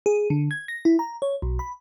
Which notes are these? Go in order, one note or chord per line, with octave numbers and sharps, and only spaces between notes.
G#4
D3
G#6
A#6
E4
A#5
C#5
B1
B5